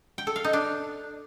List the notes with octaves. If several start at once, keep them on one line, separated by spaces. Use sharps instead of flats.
G5
A4
F5
D#4
D4